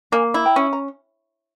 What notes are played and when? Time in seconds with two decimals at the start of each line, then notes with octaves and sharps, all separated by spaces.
0.12 A#3 F5 G#5
0.34 E4
0.45 G5 A#5
0.56 C#4
0.73 A#5